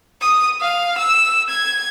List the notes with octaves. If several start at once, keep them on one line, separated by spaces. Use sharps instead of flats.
D#6
F5
E6
G#6